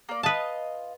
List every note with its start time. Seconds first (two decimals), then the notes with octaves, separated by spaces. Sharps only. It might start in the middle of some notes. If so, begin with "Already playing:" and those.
0.09 A#3 D5
0.23 F4 B4 D#5 A5